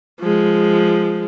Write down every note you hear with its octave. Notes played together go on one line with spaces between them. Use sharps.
F3 G#3